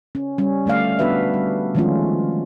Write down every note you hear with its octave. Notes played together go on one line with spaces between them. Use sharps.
C#4
G3 C#4
D3 A3 D5 F5
B3 D4 F#4 B4 E5
G3
D#3 F3 G#3 A3 C#4 F4